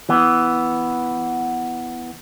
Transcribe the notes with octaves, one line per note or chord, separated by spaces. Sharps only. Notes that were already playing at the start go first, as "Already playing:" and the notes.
E3 B3